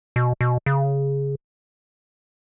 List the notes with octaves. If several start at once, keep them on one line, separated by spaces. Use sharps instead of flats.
B2
B2
C#3